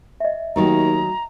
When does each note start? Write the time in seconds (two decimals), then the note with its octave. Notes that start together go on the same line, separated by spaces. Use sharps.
0.20 D#5 E5
0.56 D#2 D#3 F#3 A3 A#5